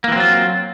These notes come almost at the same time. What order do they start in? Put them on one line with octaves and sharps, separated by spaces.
A#3 E3 C4 F#3 F4